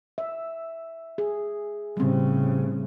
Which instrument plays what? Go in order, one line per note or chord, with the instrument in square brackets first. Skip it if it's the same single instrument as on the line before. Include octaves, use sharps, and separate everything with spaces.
[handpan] E5
G#4
[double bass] A2 C#3 [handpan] G3 C4